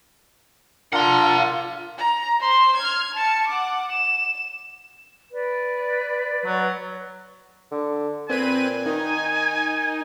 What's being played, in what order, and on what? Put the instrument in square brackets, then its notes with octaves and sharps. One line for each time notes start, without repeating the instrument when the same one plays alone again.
[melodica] D4 A#4 [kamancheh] F4 [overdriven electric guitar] F#5 C6
[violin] A#5
C5 C6
F6 G#6
A5 C#7
F#5 D6
E7
[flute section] B4 D5
[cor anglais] F#3
[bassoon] D3
[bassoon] A#2 [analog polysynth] C4 B4 D#7 [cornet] G#5
[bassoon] D#3 [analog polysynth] D#4